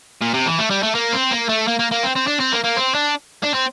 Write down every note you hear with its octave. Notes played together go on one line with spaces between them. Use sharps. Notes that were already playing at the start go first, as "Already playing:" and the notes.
A#2
C3
E3
A3
G3
A3
A#3
C4
A#3
A3
A#3
A#3
A#3
C4
C4
D4
C4
A#3
A#3
C4
D4
D4
C4